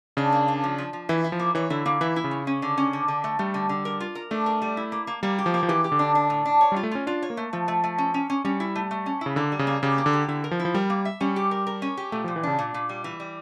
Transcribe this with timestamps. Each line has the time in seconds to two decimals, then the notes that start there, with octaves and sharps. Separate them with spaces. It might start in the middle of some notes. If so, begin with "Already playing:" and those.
0.17 C#3 D4
0.32 A#3
0.48 D4
0.64 F3
0.78 F3
0.93 F3
1.09 E3 E4
1.24 E4
1.32 F3
1.39 A#3
1.55 E3 C#5
1.70 D3 E4
1.86 D3 A#3
2.01 E3 E4
2.16 E4
2.24 C#3
2.31 C#4
2.47 C#4
2.62 D3
2.78 C#4
2.93 D3
3.08 D3
3.24 A3
3.39 G3 A3
3.54 D3
3.69 D3
3.85 A#4
4.00 F4
4.15 A#4
4.31 A3 D4
4.46 A#4
4.62 G3
4.77 E4
4.92 A#3
5.07 A#3
5.23 G3 A#3
5.39 G4
5.46 F3
5.54 A#3
5.63 F3
5.68 E3 G4
5.84 G4
5.92 D3
5.99 D4
6.15 D4
6.30 A2
6.45 D4
6.61 C#5
6.72 G3
6.76 F4
6.83 A3
6.91 C#4 F4
7.07 D4 F4
7.22 C#5
7.30 A#3
7.37 A3
7.53 F3 A3
7.68 A3
7.84 A3
7.98 C#4
8.14 C#4
8.30 C#4
8.45 G3 C#4
8.60 E4
8.76 A3
8.91 A3
9.06 C#4
9.21 C#3 E4
9.36 D3 A#3
9.52 G3
9.59 C#3
9.67 A#3
9.83 C#3 G4
9.98 A#3
10.06 D3
10.13 G4
10.28 D3 E4
10.44 A#4
10.51 F3
10.60 E4
10.65 F3
10.74 G3 A#4
10.90 A#3
11.05 E5
11.21 G3 C#4
11.36 G4
11.51 A#4
11.67 A#4
11.82 C#4
11.97 G4
12.12 A#2 A3
12.24 F3
12.28 A#2
12.36 E3
12.43 C#3 D4
12.59 A#2
12.74 A#2
12.89 G3
13.04 E3
13.20 G3